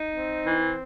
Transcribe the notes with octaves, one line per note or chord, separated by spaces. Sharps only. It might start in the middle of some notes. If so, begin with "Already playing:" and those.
Already playing: D#4
C4
E3